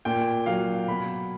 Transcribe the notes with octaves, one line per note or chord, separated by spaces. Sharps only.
A#2 G5
F#3 F5
B2 B5